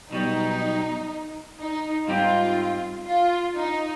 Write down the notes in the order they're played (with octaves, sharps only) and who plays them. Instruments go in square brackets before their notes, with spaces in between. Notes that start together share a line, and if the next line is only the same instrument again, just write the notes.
[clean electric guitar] B1 B2 G3 [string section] D#4
[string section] D#4
[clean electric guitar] G#2 G3 C4 D#4 G4 [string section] F4
[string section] F4
D#4